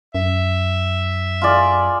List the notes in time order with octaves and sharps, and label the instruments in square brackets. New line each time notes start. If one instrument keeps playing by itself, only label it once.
[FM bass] F#2 [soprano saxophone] E5
[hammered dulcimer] F4 G#4 D5